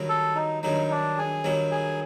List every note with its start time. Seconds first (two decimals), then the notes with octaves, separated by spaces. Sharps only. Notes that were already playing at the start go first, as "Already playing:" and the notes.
Already playing: G2 D#3 F#3
0.09 A4
0.35 D#4
0.63 G2 D#3 F#3 D#4
0.91 D4
1.18 G#4
1.44 G2 D#3 F#3
1.72 G#4